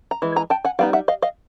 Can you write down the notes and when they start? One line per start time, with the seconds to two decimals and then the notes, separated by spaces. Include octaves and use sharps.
0.11 A#5
0.22 E3 G#3
0.36 G#5 A#5
0.50 G5 A5
0.65 F#5 G#5
0.79 G3 B3 D#4 F5 G5
0.93 E5 F#5
1.08 D#5 F5
1.22 D#5 F5